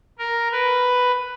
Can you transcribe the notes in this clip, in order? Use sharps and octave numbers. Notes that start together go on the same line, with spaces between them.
A#4
B4